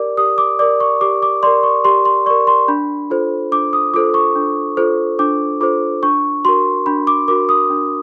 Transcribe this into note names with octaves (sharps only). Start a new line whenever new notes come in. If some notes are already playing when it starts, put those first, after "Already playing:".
Already playing: G4 A#4 D5 D6
G4 D#6
D6
A#4 D5 D6
C#6
G4 D6
D6
A#4 D5 C6
C#6
G4 C6
C6
A#4 D5 C#6
C6
D4 B5
F4 A4 C5
D4 D6
D#6
F4 A4 C5 D6
C#6
D4
F4 A4 C5
D4 D6
F4 A4 C5 D6
D4 C#6
F#4 A#4 C6
D4 B5
D6
F#4 A#4 D6
D#6
D4